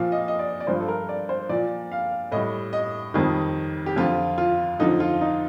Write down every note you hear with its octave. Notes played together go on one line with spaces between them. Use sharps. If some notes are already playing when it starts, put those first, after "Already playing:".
Already playing: A#2 F3 F5
D#5
D#5
D5
D5
G2 F3 C5
A4
A#4
D5
C5
A#2 F3 D5
F5
A2 G3 D#5
D#5
F2 D#3 G3
G4
F2 D3 F3 F4
F4
F2 D3 F3 D#4
F4
D#4